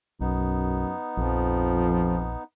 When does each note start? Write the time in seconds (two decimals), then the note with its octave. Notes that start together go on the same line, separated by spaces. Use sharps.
0.21 B1 F#2 B3 D#4
1.17 A#1 F2 F3